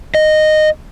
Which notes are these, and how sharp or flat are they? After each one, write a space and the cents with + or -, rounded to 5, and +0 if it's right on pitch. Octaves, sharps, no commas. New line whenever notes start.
D#5 -15